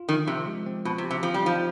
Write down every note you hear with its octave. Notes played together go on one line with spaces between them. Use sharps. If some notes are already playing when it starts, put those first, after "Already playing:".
Already playing: F4
D#3 F3
C3 F3
G#3
C4
B2 F3
C3
G4
C3
F3 C4
G3
F3 D#4